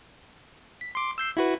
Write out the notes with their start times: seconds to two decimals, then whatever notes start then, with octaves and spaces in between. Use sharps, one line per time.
0.81 B6
0.95 C6 D6
1.18 E6 G6 C7
1.37 E4 F#4 B4